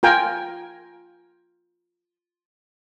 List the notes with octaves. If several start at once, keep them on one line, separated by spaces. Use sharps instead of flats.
F4 A#4 G5 G#5